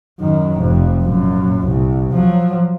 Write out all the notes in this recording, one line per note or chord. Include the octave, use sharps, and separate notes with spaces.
F#2 D#3
F1 F2
F#2 A#2
C2
F3 F#3